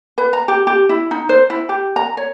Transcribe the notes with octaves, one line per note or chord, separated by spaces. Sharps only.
B4
A#5
G4
G4
E4
D#4
C5
E4
G4
A#5
C#5